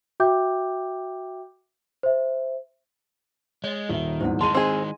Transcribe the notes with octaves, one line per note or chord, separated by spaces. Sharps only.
F#4 E5 G5 D6 G6
C5 E5
G#3 C#5 D#5
D#1 D#3 E5
D#1 E2 G#2 C5 F#5
D#3 G#3 E4 G#4 A5 C6 D#7
C4 D#4 G#4 D#5 G#5